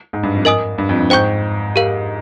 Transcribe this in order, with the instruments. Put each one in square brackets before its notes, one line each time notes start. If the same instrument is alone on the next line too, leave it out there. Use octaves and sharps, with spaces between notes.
[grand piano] G#2
G2
F2
[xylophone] A#4 D#5 G#5 D#6
[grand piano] G2
F2
G2
[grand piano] G#2 [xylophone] C5 G5 C#6 G6
[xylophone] G4 A#4 F5